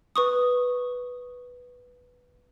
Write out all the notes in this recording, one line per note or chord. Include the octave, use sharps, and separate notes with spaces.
B4 C#6 D#6